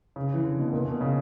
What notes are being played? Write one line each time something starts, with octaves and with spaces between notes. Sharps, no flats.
C#3
E3
D3
B2
A#2
B2
C#3